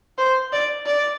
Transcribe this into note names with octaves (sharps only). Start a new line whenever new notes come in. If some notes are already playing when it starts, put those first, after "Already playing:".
C5
D5
D5